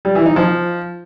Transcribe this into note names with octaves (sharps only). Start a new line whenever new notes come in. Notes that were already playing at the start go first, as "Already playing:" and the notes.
G3
E3
D#4
F3